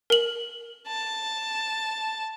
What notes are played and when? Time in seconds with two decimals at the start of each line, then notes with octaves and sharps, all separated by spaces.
0.10 A#4 F#7
0.88 A5